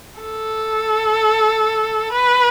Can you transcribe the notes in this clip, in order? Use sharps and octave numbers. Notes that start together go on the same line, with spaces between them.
A4
B4